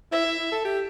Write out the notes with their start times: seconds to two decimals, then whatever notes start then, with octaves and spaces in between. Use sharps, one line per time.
0.12 E4 E5
0.25 E4
0.39 E4
0.52 A4
0.65 G4